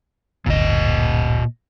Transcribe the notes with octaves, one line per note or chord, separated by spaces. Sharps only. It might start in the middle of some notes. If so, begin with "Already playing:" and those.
D1 G1 A#2 D#5